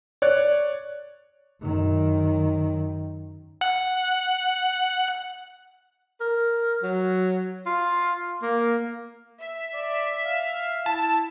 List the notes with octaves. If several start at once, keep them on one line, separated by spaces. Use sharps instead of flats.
C#5 D5 F#6
F#2 D#3
F#5 F#6
A#4
F#3
F4
A#3
E5
D5
F5
E4 A5